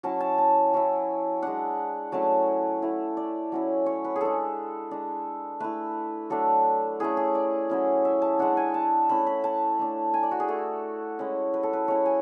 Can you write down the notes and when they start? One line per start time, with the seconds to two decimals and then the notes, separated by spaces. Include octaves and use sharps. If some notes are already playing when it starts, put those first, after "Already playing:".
0.03 F#3 C#4 E4 A5
0.20 A5
0.38 A5
0.73 F#3 C#4 E4
1.42 G#3 D4 F#5
2.12 F#3 A3 C#4 E4 A5
2.82 A3 E4
3.17 D5
3.52 F#3 C#4 E4
3.86 C#5
4.04 B4
4.16 G#4
4.21 G#3 D4 A4
4.91 G#3 D4
5.60 A3 E4 B4
6.30 F#3 A3 D4 A4
7.00 A3 C#4 E4 G#4
7.17 G#4
7.35 D5
7.70 F#3 C#4 E4
8.05 E5
8.22 A5
8.39 G#3 D4 F#5
8.57 G#5
8.74 A5
9.09 A3 C#4 E4 B5
9.26 B5
9.44 A5
9.79 A3 D4
10.14 G#5
10.23 D5
10.31 F#4
10.40 G#4
10.48 A3 E4 A4
11.19 G#3 C#4 E4
11.54 B4
11.63 A4
11.73 B4
11.88 G#3 C#4 E4 C#5
12.06 G#5